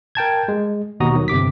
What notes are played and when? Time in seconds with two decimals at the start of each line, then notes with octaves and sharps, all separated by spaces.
0.15 A#4 G5 A5 G#6
0.48 G#3
1.00 D#2 B2 F#4 A#5 D#6
1.16 D#3 F#3
1.28 G1 C3 D6 B6